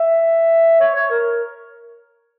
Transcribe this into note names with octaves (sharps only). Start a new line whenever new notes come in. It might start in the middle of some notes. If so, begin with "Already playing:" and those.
Already playing: E5
C#5
C#5
A#4